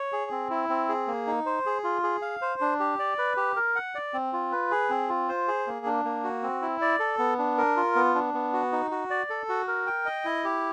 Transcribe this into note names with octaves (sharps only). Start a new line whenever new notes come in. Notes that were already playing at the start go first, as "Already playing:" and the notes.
Already playing: C#5
G#4
C4
E4
C4
G#4
A#3
D#4
C5
G#4
F4
G#4
F5
C5
D4
G4
D5
B4
G4
A#4
F#5
D5
C4
F4
B4
G#4
C4
F4
C5
G#4
A#3
D4
A#3
F#4
C4
E4
D5
A4
B3
D4
A#4
F4
B3
D4
B3
F#4
D#4
F#4
D5
A4
F#4
A#4
G5
D#5
E4
G4